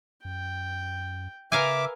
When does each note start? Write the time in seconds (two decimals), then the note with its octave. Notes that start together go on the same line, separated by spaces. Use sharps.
0.25 F#2 G5
1.52 C#3 A#4 B4 E5 F5 G#5 D6